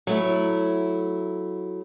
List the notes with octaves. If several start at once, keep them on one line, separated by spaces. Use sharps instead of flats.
F#3 A3 E4